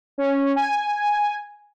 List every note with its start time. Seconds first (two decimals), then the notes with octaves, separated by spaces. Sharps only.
0.18 C#4
0.56 G#5